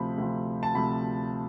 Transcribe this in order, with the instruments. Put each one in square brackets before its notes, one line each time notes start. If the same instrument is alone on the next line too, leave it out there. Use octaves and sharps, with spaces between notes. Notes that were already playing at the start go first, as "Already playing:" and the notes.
Already playing: [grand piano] D2 C3 F3 B5
D2 C3 F3
A5
D2 C3 F3 B5